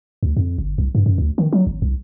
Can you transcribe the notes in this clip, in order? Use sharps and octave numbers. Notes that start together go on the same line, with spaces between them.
D2
F2
G1
C2
G2
F#2
D2
D#3
F#3
G#1
C2